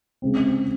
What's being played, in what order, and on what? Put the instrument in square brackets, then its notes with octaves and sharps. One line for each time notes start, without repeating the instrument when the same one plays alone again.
[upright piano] C#3 G#3 C4